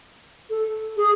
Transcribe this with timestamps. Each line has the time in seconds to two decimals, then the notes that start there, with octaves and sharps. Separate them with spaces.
0.50 A4
0.97 G#4